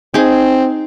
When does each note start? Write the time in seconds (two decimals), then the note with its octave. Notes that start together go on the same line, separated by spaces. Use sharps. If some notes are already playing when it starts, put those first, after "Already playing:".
0.14 C4 D#4 G#4